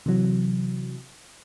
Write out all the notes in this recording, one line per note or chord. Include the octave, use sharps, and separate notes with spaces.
C3 E3 F#3